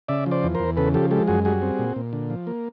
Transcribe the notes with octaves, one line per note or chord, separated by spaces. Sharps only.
C#3 D5 E5
F3
C5 D5
E2
E2 A#4 C5
C#3 A4 B4
F3 G4 A4
G#3 G4 A4
F#2 F#4 G#4
G3 F#4 G#4
C4
A#2
A#2
D3
F3
A#3